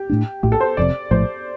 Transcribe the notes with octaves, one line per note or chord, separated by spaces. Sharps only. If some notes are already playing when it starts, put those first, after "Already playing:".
Already playing: G4
A2 A3 D4
A#1 A2 A3 G4
A4
C5
F1 F2 C3 D5
A#1 A2 F3 A3 C5